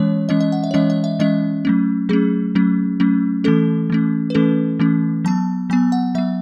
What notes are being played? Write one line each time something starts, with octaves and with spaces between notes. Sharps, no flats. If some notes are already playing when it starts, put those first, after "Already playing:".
Already playing: E3 G#3 C#4 C#5
E3 G#3 C#4 D#5
D#5
F#5
E5
C#5
E3 G#3 C#4 D#5
D#5
E5
E3 G#3 C#4 D#5
F#3 A3 C#4
F#3 A3 C#4 G#4
F#3 A3 C#4
F#3 A3 C#4
E3 A3 C#4 A4
E3 A3 C#4
B4
E3 A3 C#4 A4
E3 A3 C#4
F#3 B3 A5
F#3 B3 G#5
F#5
F#3 B3 E5